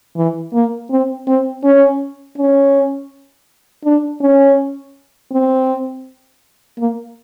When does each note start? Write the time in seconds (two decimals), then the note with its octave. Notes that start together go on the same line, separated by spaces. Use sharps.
0.17 E3
0.54 A#3
0.91 C4
1.27 C4
1.64 C#4
2.38 C#4
3.85 D4
4.21 C#4
5.32 C4
6.78 A#3